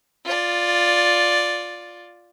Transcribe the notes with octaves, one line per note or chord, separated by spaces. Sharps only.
F4 D5